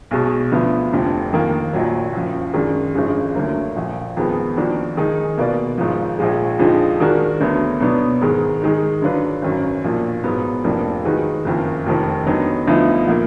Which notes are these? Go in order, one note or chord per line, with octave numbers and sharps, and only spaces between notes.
B1 B2 G#3
D2 D3 F3 B3
F1 F2 D3
F2 D#3 A#3 F4
A#1 A#2 F#3
F#1 F#2 F3
F#2 D#3 G#3 D4
G#1 F#2 D3 F3 G#3
D2 D3 F#3 A#3
A#1 A#2 F3
F2 D#3 G#3 B3
F2 D#3 A#3 D4 F#4
D#3 G#3 D#4 G#4
B2 A#3 F4 B4 D5
G#1 G#2 F3
A#1 A#2 F3 G#3
F2 D3 F3 G#3 D#4
D#3 G#3 D4 F#4 A#4
D2 D3 F#3 B3
B2 F#3 B3 D4
G#2 D#3 G#3
D#3 G#3 D#4
D3 F#3 D4 F4 B4
G#1 F#2 D#3 F#3
B1 A#2 F3 A#3 D4
G#2 F#3 B3
F1 F2 F3 A#3 D4
D#3 G#3 D#4 F#4 B4
F#1 F2 D#3 A#3
F1 F2 D#3
D3 F#3 B3 D#4
D2 D3 F3 B3 D#4
A#2 F3 A#3